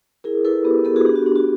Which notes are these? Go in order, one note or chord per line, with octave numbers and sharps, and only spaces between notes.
E4 G#4 A#4
E4 A4 B4
B3 G4
B3 G4 A4
F#4 G#4
D4 G4
F#4
D4 G4
F#4